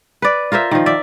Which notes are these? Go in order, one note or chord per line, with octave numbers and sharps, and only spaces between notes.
B4 D5
F4 A#4 C5 E5
D#3 F3
D5 E5